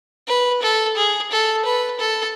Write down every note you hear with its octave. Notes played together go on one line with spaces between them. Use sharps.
B4
A4
G#4
A4
B4
A4